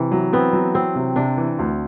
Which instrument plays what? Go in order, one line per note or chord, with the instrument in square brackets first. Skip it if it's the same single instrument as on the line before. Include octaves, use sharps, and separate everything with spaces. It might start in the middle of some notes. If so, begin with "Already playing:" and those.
Already playing: [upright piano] C3 [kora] E3
[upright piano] F#3
[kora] B3 [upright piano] C4
[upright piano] F#3
[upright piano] F#3 [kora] C4
[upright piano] C3
[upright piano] C3 [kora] D4
[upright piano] E3
D2